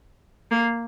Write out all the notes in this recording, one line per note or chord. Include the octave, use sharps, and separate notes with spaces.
A#3